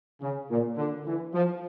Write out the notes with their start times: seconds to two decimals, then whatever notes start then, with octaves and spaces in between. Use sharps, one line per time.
0.21 C#3
0.50 A#2
0.77 D3
1.06 E3
1.34 F3